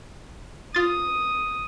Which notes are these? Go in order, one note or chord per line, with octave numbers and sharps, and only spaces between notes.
F4 D#6 A6